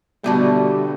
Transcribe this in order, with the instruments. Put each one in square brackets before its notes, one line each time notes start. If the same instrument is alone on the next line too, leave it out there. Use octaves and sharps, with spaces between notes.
[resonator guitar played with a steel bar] B2 D3 A3 [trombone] G3 [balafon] B3 F#4 A5